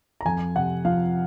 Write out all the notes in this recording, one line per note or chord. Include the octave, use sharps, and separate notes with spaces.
A#5
F2 G#5
C3 F#5
F3 F5